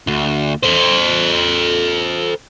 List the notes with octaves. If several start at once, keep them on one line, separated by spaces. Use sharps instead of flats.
D2
A4 C5